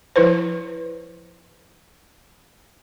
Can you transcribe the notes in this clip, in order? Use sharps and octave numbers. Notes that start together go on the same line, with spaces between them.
F3 E4 B4 C5